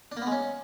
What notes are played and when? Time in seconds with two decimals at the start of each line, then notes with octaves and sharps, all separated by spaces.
0.12 D4
0.17 A#3
0.22 B3
0.27 G#3
0.32 C#4